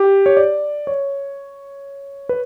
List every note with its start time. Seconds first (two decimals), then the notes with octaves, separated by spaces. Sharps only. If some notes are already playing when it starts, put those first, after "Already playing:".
Already playing: G4
0.26 C#5
0.37 D5
0.87 C#5
2.29 B4